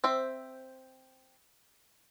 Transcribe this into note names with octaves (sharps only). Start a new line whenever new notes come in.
C4 C5 E5